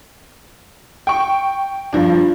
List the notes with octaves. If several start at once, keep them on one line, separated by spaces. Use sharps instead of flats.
G5 C#6
G2 F3 D4